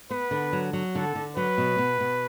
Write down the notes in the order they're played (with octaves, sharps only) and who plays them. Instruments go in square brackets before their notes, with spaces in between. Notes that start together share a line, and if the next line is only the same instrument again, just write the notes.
[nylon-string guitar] B3 [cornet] B4
[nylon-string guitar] D3
F#3
F#3
[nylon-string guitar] D3 [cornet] A4
[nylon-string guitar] D3
[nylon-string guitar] F#3 [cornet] B4
[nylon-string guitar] B2
B2
B2